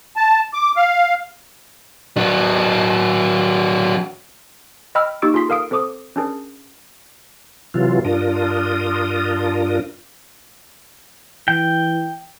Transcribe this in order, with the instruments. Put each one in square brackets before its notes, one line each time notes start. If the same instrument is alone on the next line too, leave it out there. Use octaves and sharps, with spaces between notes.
[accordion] A5
D6
F5
[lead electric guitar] F#3 D4
[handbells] D#5 G5 B5 E6 F6
A#3 D#4 G4 C#6 E6 D7
F4 G#4 C6 B6
A4 A#4 F5 D#6 D7
C4 A4 C5 D6 D#6
C#4 D4 G#4 A#4
[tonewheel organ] C3 E3 F#3 F4
G2 D4 F4 A#4 D#6
[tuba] E3 [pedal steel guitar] G5